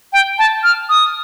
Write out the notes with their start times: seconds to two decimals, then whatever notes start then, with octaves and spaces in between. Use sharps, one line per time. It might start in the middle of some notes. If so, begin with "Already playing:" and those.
0.13 G5
0.39 A5
0.63 F6
0.89 D#6